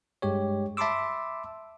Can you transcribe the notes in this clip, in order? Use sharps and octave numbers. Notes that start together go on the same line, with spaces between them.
G2 G#3 G4 C#5
E5 A5 B5 C6 D6 E6